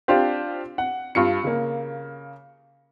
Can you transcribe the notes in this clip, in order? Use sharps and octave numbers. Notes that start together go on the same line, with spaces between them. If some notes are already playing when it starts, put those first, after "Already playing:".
C4 D4 F4 G4 C5 F5
F#5
G2 F4 C#7
C#3 A#3